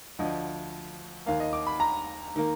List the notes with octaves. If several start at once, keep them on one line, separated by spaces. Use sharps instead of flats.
D2 D3 F3 D#5
D#2 D#3 A#3 F5
D#5
D6
B5
A#5
D#3 A#3